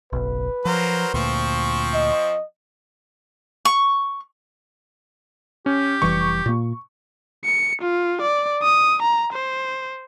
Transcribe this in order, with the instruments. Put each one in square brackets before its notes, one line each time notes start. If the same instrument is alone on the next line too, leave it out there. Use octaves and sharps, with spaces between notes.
[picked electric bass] F#1 B1 [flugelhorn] B4
[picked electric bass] F3 [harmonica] F#3 A#4 C5
[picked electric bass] D2 A#2 [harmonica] F3 C4 C#6
[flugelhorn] D#5
[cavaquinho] C#6
[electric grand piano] C#4 [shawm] G4
[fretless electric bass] F1 E3 G3 [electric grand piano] C#6
[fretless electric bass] A#2 A#3
[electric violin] C#7
F4
D5
D#6
A#5
C5